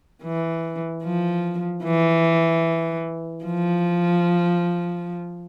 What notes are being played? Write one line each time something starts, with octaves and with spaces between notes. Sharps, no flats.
E3
F3
E3
F3